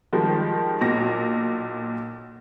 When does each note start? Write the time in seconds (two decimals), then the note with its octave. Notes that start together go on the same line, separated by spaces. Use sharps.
0.13 D#3 F3 G3 G#3
0.81 B1 A#2 A#6